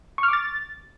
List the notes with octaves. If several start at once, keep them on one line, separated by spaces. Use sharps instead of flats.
C#6
F6
D6
A6